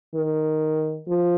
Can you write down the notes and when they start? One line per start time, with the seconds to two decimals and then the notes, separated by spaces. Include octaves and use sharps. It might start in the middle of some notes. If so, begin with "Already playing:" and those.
0.15 D#3
1.08 F3